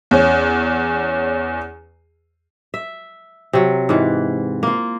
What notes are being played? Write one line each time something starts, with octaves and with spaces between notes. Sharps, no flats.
E2 C#4
E5
C3 F#3
G#2 E3
A#3 F4